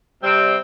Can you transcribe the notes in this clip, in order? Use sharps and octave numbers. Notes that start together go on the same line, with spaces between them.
C3 G3 C4